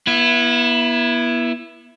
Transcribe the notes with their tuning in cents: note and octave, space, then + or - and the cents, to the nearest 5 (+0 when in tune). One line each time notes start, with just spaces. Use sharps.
B3 -35 E4 +10